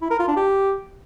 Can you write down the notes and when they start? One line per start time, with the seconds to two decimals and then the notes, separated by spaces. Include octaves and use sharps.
0.02 E4
0.11 A#4
0.19 F4
0.28 D4
0.37 G4